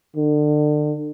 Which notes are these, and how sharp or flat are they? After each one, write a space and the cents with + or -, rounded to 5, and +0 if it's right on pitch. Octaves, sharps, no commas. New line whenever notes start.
D3 +30